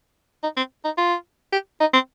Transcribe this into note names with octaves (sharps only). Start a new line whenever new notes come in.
D#4
C4
D#4
F4
G4
D#4
C4